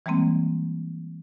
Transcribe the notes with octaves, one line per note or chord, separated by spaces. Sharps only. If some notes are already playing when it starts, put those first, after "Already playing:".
E3 G3 G#3 A#3 C4